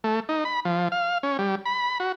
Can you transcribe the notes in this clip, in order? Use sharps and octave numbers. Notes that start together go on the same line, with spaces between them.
A3
D#4
B5
F3
F5
C#4
G3
B5
F#4